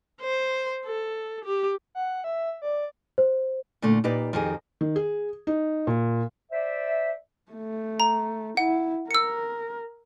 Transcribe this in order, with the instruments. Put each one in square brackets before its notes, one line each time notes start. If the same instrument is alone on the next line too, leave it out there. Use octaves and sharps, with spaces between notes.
[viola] C5
A4
G4
[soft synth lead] F#5
E5
D5
[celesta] C5
[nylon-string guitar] A#2 D3 A3
A#2 D#4 G4 B4 D5
F2 D#3 G4 G#4
[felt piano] D#3
G#4
D#4
A#2
[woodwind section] C5 D5 E5
[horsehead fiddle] A3
[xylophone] A#5
[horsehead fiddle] E4 [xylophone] F#5
[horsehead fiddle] A#4 [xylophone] E6 C#7